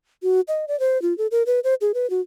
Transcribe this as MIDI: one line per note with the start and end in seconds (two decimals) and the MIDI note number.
0.23 0.41 66
0.48 0.65 75
0.68 0.78 74
0.80 1.00 72
1.02 1.16 65
1.18 1.27 69
1.31 1.43 70
1.46 1.60 71
1.64 1.74 72
1.81 1.92 68
1.94 2.09 71
2.10 2.21 66